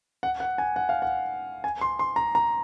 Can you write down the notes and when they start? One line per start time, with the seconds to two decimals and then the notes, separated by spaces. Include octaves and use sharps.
0.23 F#5
0.40 F#5
0.58 G#5
0.76 F#5
0.89 F5
1.02 F#5
1.64 G#5
1.81 C6
1.99 C6
2.16 A#5
2.35 A#5